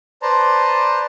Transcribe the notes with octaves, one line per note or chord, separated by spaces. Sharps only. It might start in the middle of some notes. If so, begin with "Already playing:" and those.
B4 C5 D5 A5 A#5 C6